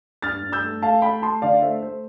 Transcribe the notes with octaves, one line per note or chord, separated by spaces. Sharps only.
G2 F6 A6
G2
E6 G6
A3
A3 F5 A5
A3 G5 B5
A3 A5 C6
D3 D5 F5
A3 C5 E5
A3 C5